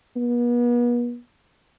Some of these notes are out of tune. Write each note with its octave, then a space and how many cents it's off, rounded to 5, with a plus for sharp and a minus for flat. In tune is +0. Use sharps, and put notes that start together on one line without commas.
B3 -40